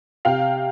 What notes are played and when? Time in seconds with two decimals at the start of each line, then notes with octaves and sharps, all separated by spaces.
0.25 C3 F5 G5